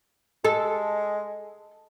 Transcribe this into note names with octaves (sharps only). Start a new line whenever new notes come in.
G#3 A4